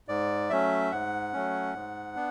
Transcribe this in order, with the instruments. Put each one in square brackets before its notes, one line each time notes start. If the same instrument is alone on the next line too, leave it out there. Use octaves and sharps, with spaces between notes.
[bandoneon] G#2 D5
F#3 A3 C#4 E5
G#2 F#5
F#3 A3 C#4
G#2
B3 D4